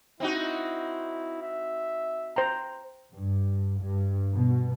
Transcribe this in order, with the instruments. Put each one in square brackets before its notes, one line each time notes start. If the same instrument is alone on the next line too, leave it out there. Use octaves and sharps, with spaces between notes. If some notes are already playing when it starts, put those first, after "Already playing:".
[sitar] C4 D#4 F#4 [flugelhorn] E4
[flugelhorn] E5
[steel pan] C5 G5 A#5
[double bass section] G2
G2
B2